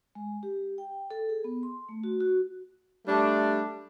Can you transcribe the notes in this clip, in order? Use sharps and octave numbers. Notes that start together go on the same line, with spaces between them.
G#3
G4
G5
A4
G#4
B3
C6
A3
F#4
F#4
G3 A3 D4